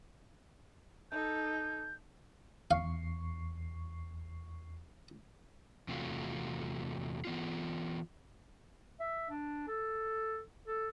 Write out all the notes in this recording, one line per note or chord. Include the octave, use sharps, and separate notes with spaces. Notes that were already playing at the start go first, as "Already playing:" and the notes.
D#4 A4 G6
E2 F5 C#6 C7
E2 C3 A3 F4 F#4
E3 B3 F4
E5
D4
A4
A4